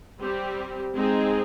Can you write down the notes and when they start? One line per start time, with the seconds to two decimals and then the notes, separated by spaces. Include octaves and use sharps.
0.20 G3 C4 G4
0.95 G#3 C4 D#4 G#4